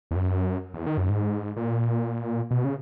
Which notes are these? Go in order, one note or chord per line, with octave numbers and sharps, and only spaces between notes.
E2
F#2
E2
D#3
F#2
G#2
A#2
B2
C#3